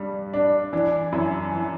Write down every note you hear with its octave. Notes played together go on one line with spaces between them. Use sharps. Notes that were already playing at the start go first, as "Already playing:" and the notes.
Already playing: G2 G3
D4
E3 D4
F#2 E4
E3